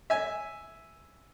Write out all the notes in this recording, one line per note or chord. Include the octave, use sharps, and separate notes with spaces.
E5 G#5